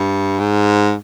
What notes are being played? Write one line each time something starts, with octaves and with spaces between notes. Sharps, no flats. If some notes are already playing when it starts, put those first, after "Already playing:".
Already playing: G2
G#2